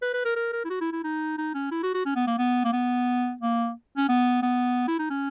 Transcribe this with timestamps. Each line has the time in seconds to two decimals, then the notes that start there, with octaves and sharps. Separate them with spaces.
0.02 B4
0.14 B4
0.25 A#4
0.36 A#4
0.53 A#4
0.65 E4
0.70 F#4
0.81 E4
0.92 E4
1.04 D#4
1.38 D#4
1.54 C#4
1.71 E4
1.83 F#4
1.94 F#4
2.06 C#4
2.16 B3
2.27 A#3
2.38 B3
2.65 A#3
2.73 B3
3.41 A#3
3.97 C#4
4.09 B3
4.43 B3
4.88 E4
4.99 D#4
5.10 C#4